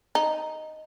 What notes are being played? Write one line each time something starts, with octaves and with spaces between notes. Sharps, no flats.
D#4